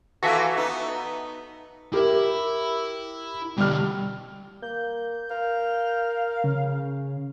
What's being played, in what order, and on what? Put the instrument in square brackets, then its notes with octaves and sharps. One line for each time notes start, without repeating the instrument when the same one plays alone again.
[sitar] E3 A#3 F4 [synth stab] F#4 A4 E5
[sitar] B3 D#4
[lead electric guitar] E4 E5 [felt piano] G4 A#4
[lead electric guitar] B2 D3 [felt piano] G3 F6
[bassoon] A#3 [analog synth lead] G6
[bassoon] A#4 [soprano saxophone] F5
[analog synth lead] C#3